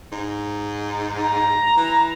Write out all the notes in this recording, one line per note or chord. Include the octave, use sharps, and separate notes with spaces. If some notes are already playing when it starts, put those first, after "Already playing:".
G#2
A#5
E3